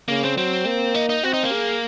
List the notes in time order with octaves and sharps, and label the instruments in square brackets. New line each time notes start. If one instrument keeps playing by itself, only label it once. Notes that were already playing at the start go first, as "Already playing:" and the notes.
[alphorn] C#3 [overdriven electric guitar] A#3
[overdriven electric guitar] C4
[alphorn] F#3 [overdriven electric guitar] C4
[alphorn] A#3
[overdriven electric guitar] D#4
D#4
[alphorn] C4 [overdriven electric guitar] F#4
[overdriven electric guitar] D#4
A#3
[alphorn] G#4